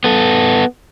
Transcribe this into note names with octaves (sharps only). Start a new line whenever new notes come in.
B3 A4